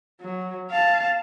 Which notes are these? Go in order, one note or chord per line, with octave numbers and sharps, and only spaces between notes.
F#3
F5 A5